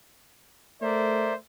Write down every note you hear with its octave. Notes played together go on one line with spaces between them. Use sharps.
A3 A#4 C5 D5 E5